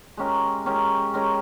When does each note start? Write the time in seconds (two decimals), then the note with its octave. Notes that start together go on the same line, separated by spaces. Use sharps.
0.17 G#3 C#4 G4 A#4
0.66 G#3 C#4 G4 A#4
1.14 G#3 C#4 G4 A#4